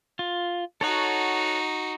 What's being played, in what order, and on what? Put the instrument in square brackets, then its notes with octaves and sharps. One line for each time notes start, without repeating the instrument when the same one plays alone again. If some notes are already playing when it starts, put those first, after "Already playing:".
[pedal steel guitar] F4
[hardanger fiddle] D#4 F#4 [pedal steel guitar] A4 C#5 F#5